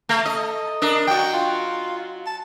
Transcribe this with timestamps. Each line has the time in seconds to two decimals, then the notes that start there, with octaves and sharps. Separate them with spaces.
0.09 A3
0.25 A4 D#5
0.82 D4 A#4 D#5
1.07 F#3 F#4 G5
1.33 F4
2.26 A5